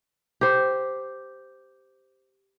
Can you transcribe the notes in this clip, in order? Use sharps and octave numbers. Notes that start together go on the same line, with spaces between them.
G4 C5